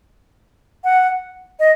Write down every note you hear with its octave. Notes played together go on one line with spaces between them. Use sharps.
F#5
D#5